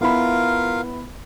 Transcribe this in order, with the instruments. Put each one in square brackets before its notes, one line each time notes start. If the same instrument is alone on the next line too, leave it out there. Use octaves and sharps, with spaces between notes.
[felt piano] B3 E4 B5 [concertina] F4 A#4 F5